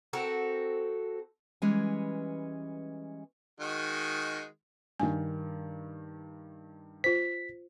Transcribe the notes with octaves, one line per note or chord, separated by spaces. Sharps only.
C4 F#4 A4 A#4
E3 G3 G#3 C#4 B4 G#5
D#3 G#3 F#4
G2 D#3 G#5
F4 C5 B6